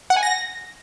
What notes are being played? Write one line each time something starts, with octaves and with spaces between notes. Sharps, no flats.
F#5
G#5
A#6